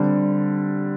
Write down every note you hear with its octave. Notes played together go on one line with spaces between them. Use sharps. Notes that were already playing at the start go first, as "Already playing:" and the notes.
Already playing: D3 G3 C4